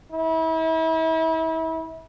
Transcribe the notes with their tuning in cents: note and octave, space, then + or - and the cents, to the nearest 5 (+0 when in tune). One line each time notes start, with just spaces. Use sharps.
E4 -35